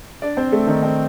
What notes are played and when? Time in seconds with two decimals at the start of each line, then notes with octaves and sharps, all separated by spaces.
0.22 D4 D5
0.37 C4 C5
0.52 A3 A4
0.67 D#3 D#4
0.83 C4